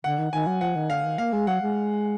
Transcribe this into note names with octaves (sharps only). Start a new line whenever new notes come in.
D3 F#5
D#3
D#3 G#5
F#3
F3 F#5
D#3
D3 F5
D#3
A#3 F5
G#3
F#3 F#5
G#3